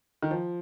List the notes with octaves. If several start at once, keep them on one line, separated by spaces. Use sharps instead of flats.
D#3
F3